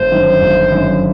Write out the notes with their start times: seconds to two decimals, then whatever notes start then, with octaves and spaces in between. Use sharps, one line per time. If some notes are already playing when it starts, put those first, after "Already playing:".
Already playing: G1 C5
0.12 F#2 D#3
0.42 G1
0.72 F#2 D#3